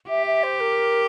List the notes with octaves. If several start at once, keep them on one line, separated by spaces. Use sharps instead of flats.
G4 E5
E5
C5
A#4